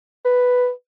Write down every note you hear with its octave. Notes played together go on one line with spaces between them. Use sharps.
B4